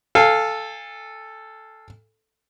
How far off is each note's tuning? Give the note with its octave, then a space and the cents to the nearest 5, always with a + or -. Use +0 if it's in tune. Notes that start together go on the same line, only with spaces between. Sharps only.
A4 +0 F5 +0 G#5 -35